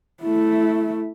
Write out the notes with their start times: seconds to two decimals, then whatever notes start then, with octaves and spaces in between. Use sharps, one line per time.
0.23 A3 E4